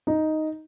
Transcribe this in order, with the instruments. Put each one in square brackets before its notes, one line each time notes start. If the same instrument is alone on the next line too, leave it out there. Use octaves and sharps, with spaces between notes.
[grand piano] D#4